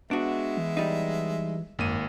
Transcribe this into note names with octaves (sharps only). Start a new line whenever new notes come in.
G#3 B3 D4 F#4 E5
E3
G3 D#4
G#1 F#2 A#3 D#7